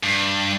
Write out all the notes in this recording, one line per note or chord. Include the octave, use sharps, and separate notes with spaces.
G2